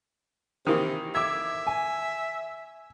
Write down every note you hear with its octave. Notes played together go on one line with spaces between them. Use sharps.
C3 D#3 E3 A#3
E5 D6 E6 G#6
G#5